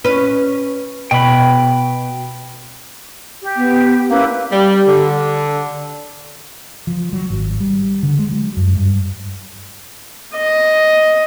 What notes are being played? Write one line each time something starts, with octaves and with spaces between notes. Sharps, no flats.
C#4 B4
B2 G5 B5
G4
B3
A#3 C#4 E4 B4
G3
D3
F3
F#3
G#1
G3
D3
G#3
F#3
F#2
G2
D#5